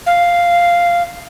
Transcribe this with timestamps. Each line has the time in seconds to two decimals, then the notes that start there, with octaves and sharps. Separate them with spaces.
0.06 F5